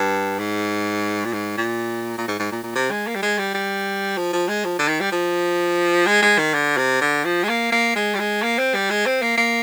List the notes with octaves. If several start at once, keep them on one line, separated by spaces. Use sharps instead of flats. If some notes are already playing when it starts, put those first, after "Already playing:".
Already playing: G2
G#2
A#2
G#2
A#2
A#2
G#2
G#2
A#2
A#2
C3
G#3
A#3
G3
G#3
G3
G3
F3
F3
G#3
F3
D3
D#3
G3
F3
G#3
G#3
D#3
D3
C3
D3
F3
G#3
A#3
A#3
G#3
G3
G#3
A#3
C4
G3
G#3
C4
A#3
A#3